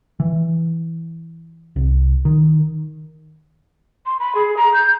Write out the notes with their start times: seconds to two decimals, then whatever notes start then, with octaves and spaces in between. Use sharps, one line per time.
0.20 E3
1.76 C2
2.25 D#3
4.06 C6
4.20 B5
4.35 G#4
4.57 A#5
4.74 G6